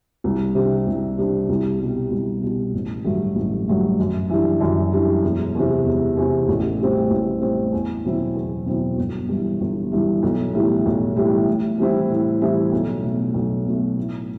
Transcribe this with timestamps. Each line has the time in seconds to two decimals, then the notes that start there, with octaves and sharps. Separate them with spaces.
0.24 C2
0.55 C3 G3 D4
0.87 C2
1.18 C3 G3 D4
1.49 C2
1.80 B2 G3
2.11 C2
2.42 B2 G3
2.74 A1
3.05 G2 F#3 A3
3.36 A1
3.67 G2 F#3 A3
3.99 F#2
4.30 E3 G3 D4
4.61 F#2
4.92 E3 G3 D4
5.24 E1
5.55 E2 C3
5.86 E1
6.17 E2 C3
6.48 A1
6.79 A2 G3 C4
7.10 A1
7.42 A2 G3 C4
7.72 E2
8.04 B2 F#3 C4 E4
8.36 E2
8.66 B2 F#3 C4 E4
8.97 G1
9.29 G2 E3
9.60 G1
9.92 G2 E3
10.23 B1
10.54 A2 E3 G3
10.86 B1
11.16 A2 E3 G3
11.48 A2
11.78 E3 G3 C4 E4
12.09 A2
12.41 E3 G3 C4 E4
12.72 B1
13.03 B2 A3
13.34 B1
13.66 B2 A3
13.97 A2